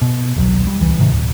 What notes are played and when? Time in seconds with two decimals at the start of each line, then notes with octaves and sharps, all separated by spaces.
0.02 B2
0.36 D#1 B1 F#3
0.67 G3
0.81 D#1 C#2 E3
1.00 G#2 C3 D#3
1.12 D1